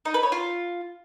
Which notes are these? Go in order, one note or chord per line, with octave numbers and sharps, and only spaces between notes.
D#4
B4
C#5
F4